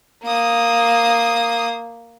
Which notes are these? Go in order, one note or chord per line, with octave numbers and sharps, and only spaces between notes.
A#3 D#6